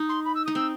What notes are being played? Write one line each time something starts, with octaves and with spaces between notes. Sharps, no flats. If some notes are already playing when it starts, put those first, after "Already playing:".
Already playing: D#4
C6
B5
E6
D#6
D#4
C4 E6